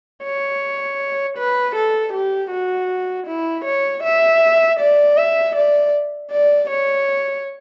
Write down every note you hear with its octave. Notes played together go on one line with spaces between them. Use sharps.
C#5
B4
A4
G4
F#4
E4
C#5
E5
D5
E5
D5
D5
C#5